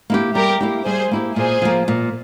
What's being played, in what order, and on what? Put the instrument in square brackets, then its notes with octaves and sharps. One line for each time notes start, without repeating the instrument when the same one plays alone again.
[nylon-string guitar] A#3 E4 G4
[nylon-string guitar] G3 [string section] G4 A#4
[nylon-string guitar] A#3 E4 G4
[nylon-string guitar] G3 [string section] G#4 C5
[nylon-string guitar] A#3 E4 G4
[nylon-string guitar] A#2 [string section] G#4 C5
[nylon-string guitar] F3 A#3
A#2